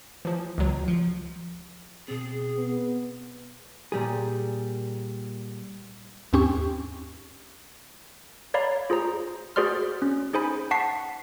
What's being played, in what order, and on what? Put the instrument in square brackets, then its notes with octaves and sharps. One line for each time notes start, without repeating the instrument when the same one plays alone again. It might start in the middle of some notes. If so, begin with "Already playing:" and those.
[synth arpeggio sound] E3 F3
C#2 F#3
[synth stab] F3
[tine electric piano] B2 C4 [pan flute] G#4
[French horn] B3
[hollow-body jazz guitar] A#2 G3 G#4
[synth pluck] D#2 G#2 C4 C#4 G4 C#6
[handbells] C#5 D5 F5 A#5 B5
F4 G#4 C5 A#5
F#4 G#4 C5 D5 C6 F6
C#4
D#4 G#4 C5 G#5 B5
F#5 A5 C#6 B6 C7